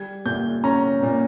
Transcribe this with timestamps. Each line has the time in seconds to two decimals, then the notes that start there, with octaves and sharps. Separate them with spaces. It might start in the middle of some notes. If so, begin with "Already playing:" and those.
Already playing: G3 G#6
0.25 A#2 G6
0.64 C#4 A#5
1.02 A#2